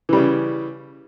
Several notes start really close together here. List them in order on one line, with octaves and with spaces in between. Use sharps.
E3 G3 C#3